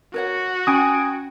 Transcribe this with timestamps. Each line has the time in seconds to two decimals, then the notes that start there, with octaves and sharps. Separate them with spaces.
0.14 F#4 A#4 C#5 F#5
0.67 C#4 G5 G#5 B5 D#6